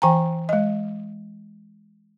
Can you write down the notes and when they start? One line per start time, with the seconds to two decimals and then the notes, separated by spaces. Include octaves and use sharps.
0.02 E3 G5 G#5 A#5
0.49 G#3 D#5